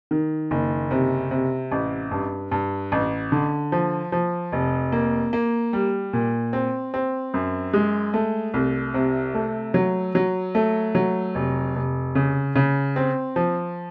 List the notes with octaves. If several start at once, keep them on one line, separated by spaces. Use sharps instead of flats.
D#3
F#1
C3
C3
A1
G2
G2
A1
D3
F3
F3
F1
A#3
A#3
G3
A#2
C4
C4
F#2
G#3
A3
C2
C3
A3
F#3
F#3
A3
F#3
F1
F1
C#3
C#3
C4
F3